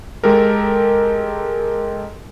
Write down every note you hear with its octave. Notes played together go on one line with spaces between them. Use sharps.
G#3 G4 A4 A#4